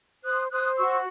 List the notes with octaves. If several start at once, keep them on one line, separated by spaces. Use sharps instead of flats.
C5 D#6 F#6
C5 D#6 F#6
F#4 C#6 E6